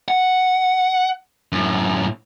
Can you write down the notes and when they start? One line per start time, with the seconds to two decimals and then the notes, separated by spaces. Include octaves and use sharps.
0.08 F#5
1.52 F#2 A2